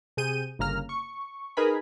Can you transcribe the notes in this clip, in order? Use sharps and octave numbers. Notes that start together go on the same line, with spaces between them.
C3 G#4 G6 D#7
G1 C#3 A#3 A#5 F6
C#6
D#4 G#4 A#4 B4 G#5 B5